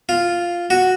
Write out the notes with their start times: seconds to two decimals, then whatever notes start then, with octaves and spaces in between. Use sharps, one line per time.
0.09 F4
0.70 F#4